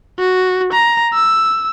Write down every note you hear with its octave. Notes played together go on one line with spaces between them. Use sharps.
F#4
A#5
E6